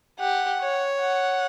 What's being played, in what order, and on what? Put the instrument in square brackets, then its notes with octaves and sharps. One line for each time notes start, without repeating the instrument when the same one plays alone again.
[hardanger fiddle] G4 [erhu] F#5
[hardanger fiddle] C#5
[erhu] F#5